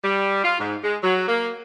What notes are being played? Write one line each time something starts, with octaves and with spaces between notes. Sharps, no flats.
G3
F4
G#2
G#3
F#3
A#3